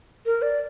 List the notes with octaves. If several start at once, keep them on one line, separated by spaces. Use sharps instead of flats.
A#4
D5